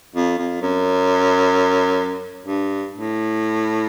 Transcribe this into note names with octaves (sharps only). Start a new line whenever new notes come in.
F2
F2
F#2
G2
A2